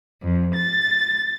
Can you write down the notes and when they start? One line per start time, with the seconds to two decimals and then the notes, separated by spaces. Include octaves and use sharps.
0.21 F2
0.54 A6